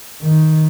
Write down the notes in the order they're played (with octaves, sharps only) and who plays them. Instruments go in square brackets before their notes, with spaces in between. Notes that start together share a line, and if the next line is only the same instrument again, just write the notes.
[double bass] D#3